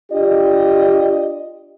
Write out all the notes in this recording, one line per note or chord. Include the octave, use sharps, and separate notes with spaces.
D4 F4 G4 D5 D#5